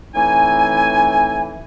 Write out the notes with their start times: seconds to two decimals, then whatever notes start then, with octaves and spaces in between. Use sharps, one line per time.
0.14 A2 E3 A3 C4 D#4 G#5